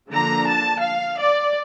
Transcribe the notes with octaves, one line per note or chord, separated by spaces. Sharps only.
D3 F3 A#3 D4 A#5
A5
F5
D5